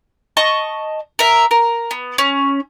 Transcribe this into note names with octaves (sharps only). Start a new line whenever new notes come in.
D#5 A5 C#6
A#4 E5
A#4
B3
C#4